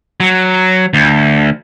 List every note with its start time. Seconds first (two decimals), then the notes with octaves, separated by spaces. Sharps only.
0.20 F#3
0.94 D2